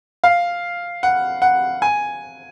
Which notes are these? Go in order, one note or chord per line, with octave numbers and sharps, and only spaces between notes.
F5
F#5
F#5
G#5